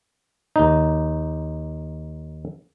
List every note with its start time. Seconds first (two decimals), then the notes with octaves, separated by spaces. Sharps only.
0.56 D#2 D#4